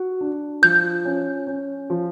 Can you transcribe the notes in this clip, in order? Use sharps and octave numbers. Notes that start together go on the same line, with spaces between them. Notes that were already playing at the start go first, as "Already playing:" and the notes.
Already playing: F#4
D4
F3 G6
C#4
C#4
F3